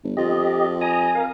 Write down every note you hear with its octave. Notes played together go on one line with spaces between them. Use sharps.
G1
F2 F4 G4 D#5
G#5 A#5 D#6
A#4 F5